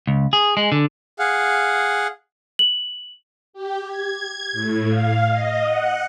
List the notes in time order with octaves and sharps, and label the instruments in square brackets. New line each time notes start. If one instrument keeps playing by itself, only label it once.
[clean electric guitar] C#2
G#4
G#3
D3
[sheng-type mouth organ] G#4 F5 F#5
[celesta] F#7
[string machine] G4
G#6
A2
F5
D#5
F#5